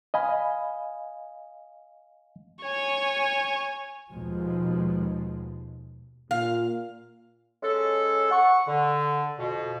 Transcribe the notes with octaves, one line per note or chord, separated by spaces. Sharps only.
D#5 F5 G#5 B5
C#5 G#5
D#2 B2 F3 G#3
A#2 F5
G#3 C#4 A4
F#5 C#6
D3
F2 B2